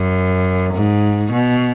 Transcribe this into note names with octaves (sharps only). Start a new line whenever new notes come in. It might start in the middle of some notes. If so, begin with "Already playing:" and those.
Already playing: F#2
G#2
B2